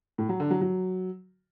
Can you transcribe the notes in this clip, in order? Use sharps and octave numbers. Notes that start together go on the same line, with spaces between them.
A2
F#3
D3
F#3
F#3